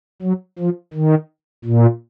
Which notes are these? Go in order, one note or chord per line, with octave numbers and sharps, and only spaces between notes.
F#3
F3
D#3
A#2